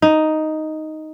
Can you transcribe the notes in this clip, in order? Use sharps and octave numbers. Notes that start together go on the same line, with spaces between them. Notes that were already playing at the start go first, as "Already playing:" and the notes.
D#4